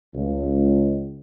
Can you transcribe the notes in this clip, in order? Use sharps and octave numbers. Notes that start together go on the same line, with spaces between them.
C#2